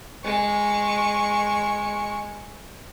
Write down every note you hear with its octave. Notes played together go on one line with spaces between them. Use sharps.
G#3 C#6